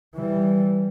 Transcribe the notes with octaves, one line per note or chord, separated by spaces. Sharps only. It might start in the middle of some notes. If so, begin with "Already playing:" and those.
E3 G3